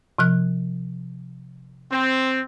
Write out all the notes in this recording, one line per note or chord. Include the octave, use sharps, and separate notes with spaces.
C3 F3 F#6
C4